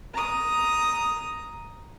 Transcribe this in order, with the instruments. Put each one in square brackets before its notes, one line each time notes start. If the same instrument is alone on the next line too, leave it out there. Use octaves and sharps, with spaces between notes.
[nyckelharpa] A#5 D#6